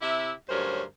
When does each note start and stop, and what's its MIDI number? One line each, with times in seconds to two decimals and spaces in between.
0.01 0.31 48
0.01 0.31 64
0.01 0.31 67
0.01 0.31 76
0.49 0.82 38
0.49 0.82 43
0.49 0.82 54
0.49 0.82 61
0.49 0.82 70
0.49 0.82 72